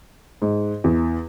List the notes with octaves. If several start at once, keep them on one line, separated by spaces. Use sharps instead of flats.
G#2
E2